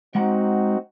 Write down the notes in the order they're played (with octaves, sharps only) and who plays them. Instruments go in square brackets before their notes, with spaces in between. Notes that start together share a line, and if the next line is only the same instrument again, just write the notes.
[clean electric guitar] G#3 F#5 A#5 [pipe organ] C4 D#4 F#4